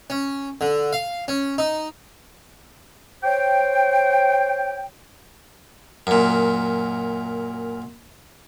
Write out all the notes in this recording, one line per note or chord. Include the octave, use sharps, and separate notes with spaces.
C#4
D3
F5
C#4
D#4
C5 C#5 G5
F#2 A#2